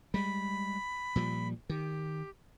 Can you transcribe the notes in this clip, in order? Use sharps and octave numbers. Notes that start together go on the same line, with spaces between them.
G3 G#3 B5
A#2 F3 G3
D#3 G4